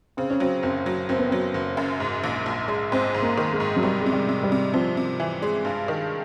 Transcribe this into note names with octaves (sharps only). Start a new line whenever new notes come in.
C#3 C4
C#4
F#3 C4
F#1 C4
F#3
F#1 C4
B3
F#3 C4
F#1
F#2
G#2
A#1
A#1
G#3
G#2 C4
G#2
A#3
D#3
G#3
G#2
F#3
C3 G3
G#3
C3
G3
C3
G3
C3
C3 F3
C3
E3
G#3
G2
D#3